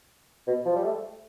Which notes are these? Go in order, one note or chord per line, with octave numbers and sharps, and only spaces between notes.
B2
F3
G3
A3